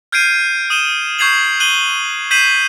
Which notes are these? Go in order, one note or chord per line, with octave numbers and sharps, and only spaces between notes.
F6 G6 G#6 C7 D7 D#7
D#6 D#7 E7 G7
C#6 G6 G#6 C7 F7 F#7
F#6 D#7 F#7 G7
G6 B6 C7 D#7 E7 F#7